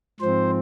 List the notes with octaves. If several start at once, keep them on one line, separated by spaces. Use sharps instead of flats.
G#2 F3 C4 C5